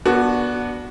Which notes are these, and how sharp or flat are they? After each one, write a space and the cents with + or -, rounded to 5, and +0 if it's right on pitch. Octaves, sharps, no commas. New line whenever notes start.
B3 -25 D4 -5 F#4 +0